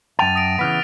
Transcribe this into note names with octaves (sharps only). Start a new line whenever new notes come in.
F#2 G5 A5 A6 D#7 F7
D#6 A#6 D7
C#3 E3 B3 F6 B6